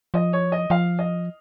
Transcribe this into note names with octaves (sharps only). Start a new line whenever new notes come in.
F3 D#5
C#5
D#5
F3 F5
D#5